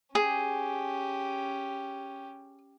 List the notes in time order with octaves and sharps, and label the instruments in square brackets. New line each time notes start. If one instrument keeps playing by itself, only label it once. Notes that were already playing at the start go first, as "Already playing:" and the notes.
[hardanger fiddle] C#4 G4 [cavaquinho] G#4